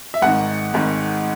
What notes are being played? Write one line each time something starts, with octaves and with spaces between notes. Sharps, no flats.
E5
G#1 G#2 D#3 F#5
G#1 G#2 D#3